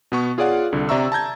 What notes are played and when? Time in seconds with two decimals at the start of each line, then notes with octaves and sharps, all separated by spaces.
0.12 B2 B3 C#6
0.38 F4 G#4 C#5 D5 F5 F#5
0.73 C2 D3
0.89 C3 D5 E5 A#5 C#6 E6
1.12 A5 A#5 G6 G#6